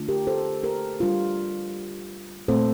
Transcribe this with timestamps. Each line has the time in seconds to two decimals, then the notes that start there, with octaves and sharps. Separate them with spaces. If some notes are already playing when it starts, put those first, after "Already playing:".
Already playing: D3 A3 D4 F4
0.08 G4 A#4
0.27 A4 C5
0.63 G4 A#4
1.00 G3 D4 F4
2.48 A#2 A3 C4 A4 C5